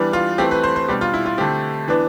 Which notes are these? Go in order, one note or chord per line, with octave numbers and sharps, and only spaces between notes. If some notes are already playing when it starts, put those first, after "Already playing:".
Already playing: E3 G3 B3 D4
F4
E3 A3 C4 G4
B4
C5
C5
B2 G3 D4 G4
F4
E4
F4
D3 A3 C4 G4
E3 B3 D4